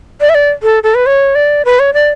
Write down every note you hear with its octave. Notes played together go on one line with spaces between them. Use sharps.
D5
E5
D5
A4
A4
B4
C#5
D5
B4
C#5
D5